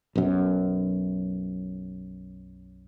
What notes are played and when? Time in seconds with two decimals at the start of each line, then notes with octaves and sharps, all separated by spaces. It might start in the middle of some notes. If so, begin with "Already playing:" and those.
0.16 B1 F#2